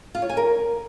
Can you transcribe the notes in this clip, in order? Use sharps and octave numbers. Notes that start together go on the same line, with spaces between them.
F4
C#5
G#5
A#4